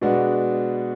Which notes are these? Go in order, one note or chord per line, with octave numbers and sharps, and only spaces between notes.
B2 G#3 B3 D4 F#4